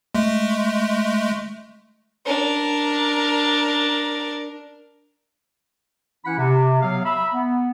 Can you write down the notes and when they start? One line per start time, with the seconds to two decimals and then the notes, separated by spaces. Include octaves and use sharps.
0.15 G#3 A3
2.26 D4 A#4
6.25 E3 C#4 E4 F#5 B5
6.37 C3
6.82 F#3 B3 F5
7.04 E5 A#5 B5
7.33 B3